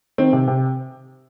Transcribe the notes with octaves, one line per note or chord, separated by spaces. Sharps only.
D#3 C4
C3
C3